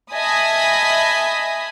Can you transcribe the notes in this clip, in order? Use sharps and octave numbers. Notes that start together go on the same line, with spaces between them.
D#5 E5 G#5 A5 B5 D#6